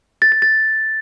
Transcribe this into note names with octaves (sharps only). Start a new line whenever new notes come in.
A6
A6
A6